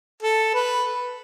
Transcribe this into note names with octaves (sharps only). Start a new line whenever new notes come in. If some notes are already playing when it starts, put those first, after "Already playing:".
A4
B4